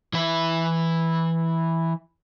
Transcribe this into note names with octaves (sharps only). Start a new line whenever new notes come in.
E3 E4